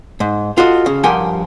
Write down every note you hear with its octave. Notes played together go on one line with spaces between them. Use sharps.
G#2
F4 F#4 A4 D#5
C#3
G2 F3 G4 A#4 F#5 G#5